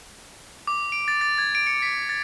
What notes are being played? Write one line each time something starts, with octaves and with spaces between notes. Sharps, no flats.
D6
D7
A6
A6
G#6
D7
C#7
B6
A6